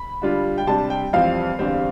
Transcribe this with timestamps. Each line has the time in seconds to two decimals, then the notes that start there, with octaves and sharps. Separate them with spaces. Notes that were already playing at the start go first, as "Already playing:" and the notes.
Already playing: B5
0.22 D3 G3 D4 F4
0.58 G5
0.67 C3 G3 D4 A5
0.90 G5
1.13 F2 E3 G3 C4 F5
1.59 E2 D3 G3 C4